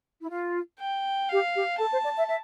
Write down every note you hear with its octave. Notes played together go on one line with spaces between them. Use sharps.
E4
F4
G5
G4 F5
G4
A4 A5
C5
D5
E5
E5